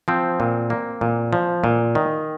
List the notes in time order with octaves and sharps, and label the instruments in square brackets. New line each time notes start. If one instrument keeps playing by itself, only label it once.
[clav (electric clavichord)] F3 C4
A#2
A#3
A#2
F3
A#2
D#3